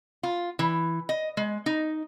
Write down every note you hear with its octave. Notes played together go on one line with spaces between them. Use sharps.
F4
E3
D#5
G#3
D#4